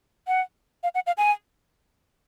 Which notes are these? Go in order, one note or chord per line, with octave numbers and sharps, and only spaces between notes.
F#5
F5
F#5
F5
G#5